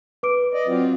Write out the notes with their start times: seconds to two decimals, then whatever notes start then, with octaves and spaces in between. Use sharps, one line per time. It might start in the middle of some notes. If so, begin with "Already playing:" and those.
0.23 B4 D6 D7
0.54 D5 D#5
0.67 F#3 C4 F4